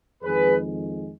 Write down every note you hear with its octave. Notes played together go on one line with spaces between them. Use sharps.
F2 D#3 G#3 G#4 B4